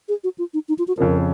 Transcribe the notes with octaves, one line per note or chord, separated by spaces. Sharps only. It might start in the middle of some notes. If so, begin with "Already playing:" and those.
G#4
F#4
F4
D#4
D#4
F4
F#4
F2 C#3 F3 A#4